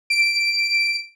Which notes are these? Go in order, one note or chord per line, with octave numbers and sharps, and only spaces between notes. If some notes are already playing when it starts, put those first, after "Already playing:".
D7